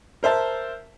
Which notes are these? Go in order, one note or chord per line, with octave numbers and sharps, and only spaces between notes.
A#4 C5 E5 A5